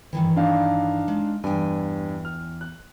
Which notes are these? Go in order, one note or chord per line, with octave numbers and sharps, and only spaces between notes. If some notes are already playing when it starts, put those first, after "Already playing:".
G2 D#3 E3
D4 D#4 F5
G#3
E2 G2 G5 G#5
F6
F#6